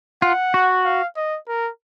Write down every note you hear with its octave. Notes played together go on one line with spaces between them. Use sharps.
F4 F#5
F#4
F5
D#5
A#4